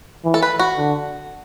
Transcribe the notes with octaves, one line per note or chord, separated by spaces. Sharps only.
E3
A4
B4
F#4
D3